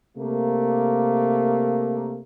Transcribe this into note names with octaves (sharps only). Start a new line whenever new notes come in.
C3 A3 A#3